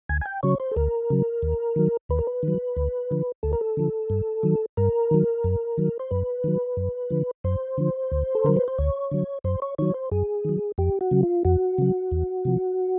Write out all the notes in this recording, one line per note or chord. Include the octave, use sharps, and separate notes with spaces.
D2 G#5
G#5
G5
C#3 F#3 C#5
C5
A4
D2 A#4
C#3 F#3
D#2
D#3 F#3
D#2 B4
A#4
B4
D#3
F#3
D2
D3 F3
D2 A4
A#4
A4
D3 F3
G2
D#3 F#3
G2 A#4
D#3 F#3
F#2
D#3 F#3
C5
F#2 B4
D#3 F#3
F#2
D3 F3
F#2 C5
D3 F3
D2
A4
D3 F#3 A#4
B4
C5
D2 C#5
D3 F#3
F#2 C5
C#5
D#3 F#3 C#5
C5
F#2 G#4
D#3 F#3
F2 G4
F#4
C#3 F#3
F4
F2 F#4
C#3 F#3
E2
C3 F3